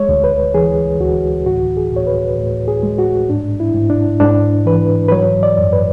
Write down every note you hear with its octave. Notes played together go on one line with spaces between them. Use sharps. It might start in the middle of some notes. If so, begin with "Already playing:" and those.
Already playing: G#3 C#5
D2
B4
E3 G#4
D2 F#4
A2 F#4
G#4
A2 C#5
B4
A2
G#4
G#3
F#4
G#2 D4
E4
G#2
D4
G#2 D4
E3 B4
B4
F#3 C#5
D5
F#2
B4